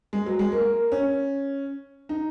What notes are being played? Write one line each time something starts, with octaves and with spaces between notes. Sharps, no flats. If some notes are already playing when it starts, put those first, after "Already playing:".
G#3
F#3
G#3
A#3
C#4
D#4